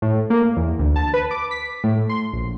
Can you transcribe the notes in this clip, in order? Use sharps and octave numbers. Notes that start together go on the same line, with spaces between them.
A2
A#3
E2
D2
A5
B4
D6
B6
A2
C6
A#1